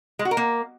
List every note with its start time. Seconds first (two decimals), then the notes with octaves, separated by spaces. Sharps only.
0.19 G#3
0.25 F#4
0.31 A#4
0.37 A#3